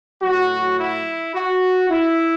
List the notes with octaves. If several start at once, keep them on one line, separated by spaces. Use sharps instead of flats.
A2 F#3 F#4
E4
F#4
E4